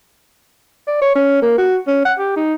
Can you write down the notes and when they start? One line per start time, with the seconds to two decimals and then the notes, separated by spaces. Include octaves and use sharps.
0.87 D5
1.01 C#5
1.15 C#4
1.42 A#3
1.58 F#4
1.87 C#4
2.05 F#5
2.18 G4
2.36 D#4